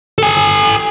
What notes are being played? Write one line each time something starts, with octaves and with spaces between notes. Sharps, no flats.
A4 G#5